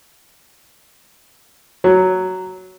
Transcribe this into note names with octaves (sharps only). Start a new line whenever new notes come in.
F#3